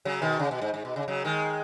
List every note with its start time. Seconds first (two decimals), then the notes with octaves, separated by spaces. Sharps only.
0.05 C#3 F#3
0.22 B2 D#3
0.39 C#3
0.51 B2
0.61 G#2
0.74 G#2
0.85 B2
0.96 C#3
1.08 C#3 F#3
1.25 D#3 G#3